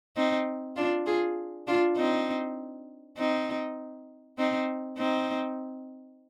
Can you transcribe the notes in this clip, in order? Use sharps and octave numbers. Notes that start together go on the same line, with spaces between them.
C4 D#4
D4 F4
F4 G#4
D4 F4
C4 D#4
C4 D#4
C4 D#4
C4 D#4